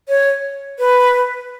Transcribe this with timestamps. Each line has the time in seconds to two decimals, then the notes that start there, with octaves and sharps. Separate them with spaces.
0.09 C#5
0.79 B4